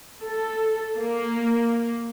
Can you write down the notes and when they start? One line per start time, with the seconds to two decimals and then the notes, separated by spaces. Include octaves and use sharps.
0.23 A4
0.97 A#3